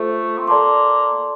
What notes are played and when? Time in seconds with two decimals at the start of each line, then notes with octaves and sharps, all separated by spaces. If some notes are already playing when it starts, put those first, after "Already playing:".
Already playing: A3 F4 A4 C5
0.38 C4
0.47 A#3 A4 D5 A5 C6